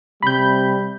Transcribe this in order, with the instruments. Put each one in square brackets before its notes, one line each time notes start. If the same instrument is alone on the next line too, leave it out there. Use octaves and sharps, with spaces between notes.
[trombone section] C3 G3 [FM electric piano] B5 G6